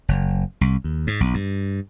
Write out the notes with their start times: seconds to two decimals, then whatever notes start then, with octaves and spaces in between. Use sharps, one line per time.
0.08 F#1
0.61 C2
0.84 D#2
1.07 G#2
1.20 B1
1.34 G2